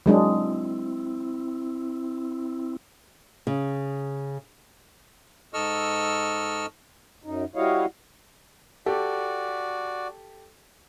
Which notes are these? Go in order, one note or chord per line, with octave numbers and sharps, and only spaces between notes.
F#3 G#3 C4 D4 E4
C#3
G#2 A4 D#5 C#6 E6 F6
F#2 D#4
G3 E4 F#4 C#5 D#5 F5
F#4 G4 A4 D5